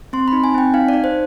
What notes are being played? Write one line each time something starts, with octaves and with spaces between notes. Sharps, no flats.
C4 C6
B5
D#4
G#5
C4 G5
D#4 F5
D5
D#4
C5